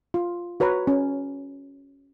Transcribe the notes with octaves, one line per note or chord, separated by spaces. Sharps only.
F4
F#4 B4 C#5 A#5
C#4